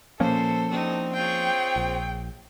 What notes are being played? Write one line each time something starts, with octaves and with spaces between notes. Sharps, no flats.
A#2 F3 A#3 C#4 A4 C5
C4 D4 D#4 F#4
F4 G#4 C#5 G5
A#1